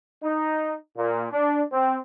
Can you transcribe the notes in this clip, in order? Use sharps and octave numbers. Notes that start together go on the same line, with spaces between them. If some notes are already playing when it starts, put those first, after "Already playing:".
D#4
A#2
D4
C4